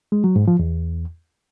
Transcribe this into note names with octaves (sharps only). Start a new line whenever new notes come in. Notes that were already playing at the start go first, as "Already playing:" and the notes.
G#3
F#3
G#2
F3
E2